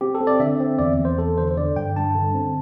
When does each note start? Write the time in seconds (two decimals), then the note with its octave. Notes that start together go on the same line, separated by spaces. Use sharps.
0.01 C4 G4
0.15 A4
0.21 C4
0.27 D5
0.40 D3 E5
0.60 C4
0.79 E2 D5
0.98 E2
1.05 C5
1.18 E2 A4
1.38 D3 C5
1.51 C5
1.57 D3 D5
1.76 G2 G5
1.96 G2 A5
2.15 D3
2.35 C4